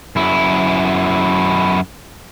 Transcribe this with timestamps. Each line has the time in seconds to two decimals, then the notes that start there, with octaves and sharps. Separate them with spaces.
0.16 F#2 E4